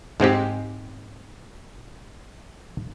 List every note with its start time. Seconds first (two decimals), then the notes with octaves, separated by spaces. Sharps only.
0.20 G#2 G#3 C4 G4